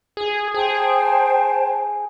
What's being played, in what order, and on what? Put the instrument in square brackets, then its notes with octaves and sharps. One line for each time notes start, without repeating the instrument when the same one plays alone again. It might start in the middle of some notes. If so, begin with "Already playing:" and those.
[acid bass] G#4
[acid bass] G#4 [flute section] C5 G5 A5